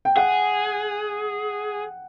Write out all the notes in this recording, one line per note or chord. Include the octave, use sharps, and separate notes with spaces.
G5
G#4 F#5